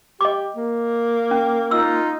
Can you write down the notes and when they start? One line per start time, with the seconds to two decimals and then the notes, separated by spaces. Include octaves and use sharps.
0.21 G4 D#5 D6
0.56 A#3
1.31 C#4
1.71 D#4 F4 E6